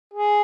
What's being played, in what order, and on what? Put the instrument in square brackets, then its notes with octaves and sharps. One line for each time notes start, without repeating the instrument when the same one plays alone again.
[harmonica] G#4